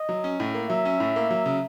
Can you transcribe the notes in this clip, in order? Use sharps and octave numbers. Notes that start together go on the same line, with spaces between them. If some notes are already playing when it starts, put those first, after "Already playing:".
Already playing: D#5
F#3
C#4
A2
A#3
F#3 E5
C#4
A2
A#3
F#3
C#3